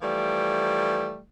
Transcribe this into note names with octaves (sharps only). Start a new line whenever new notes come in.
E3 F3 G3 A3